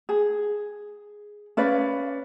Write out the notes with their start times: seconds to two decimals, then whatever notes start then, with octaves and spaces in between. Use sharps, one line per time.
0.09 G#4
1.57 C#4 B4 D5 F5